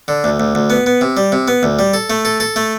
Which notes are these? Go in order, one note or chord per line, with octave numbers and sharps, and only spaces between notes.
D3
D2
D2
D2
B3
B3
C3
G3
C3
B3
D2
G3
A4
A3
A4
A4
A3